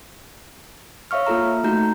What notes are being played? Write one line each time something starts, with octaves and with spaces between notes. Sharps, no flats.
C#5 E5 F5 C#6 F6
A#3 F4 A4 A#5
A3 D#4 F#4 A#5 G6